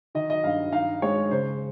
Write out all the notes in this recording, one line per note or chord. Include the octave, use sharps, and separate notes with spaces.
D#3 D#5
D#5
G2 F5
D#4 F5
G#3 C#5
C#3 C5